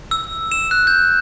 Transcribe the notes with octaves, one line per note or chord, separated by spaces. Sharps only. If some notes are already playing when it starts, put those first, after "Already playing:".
E6
E7
F#6
G6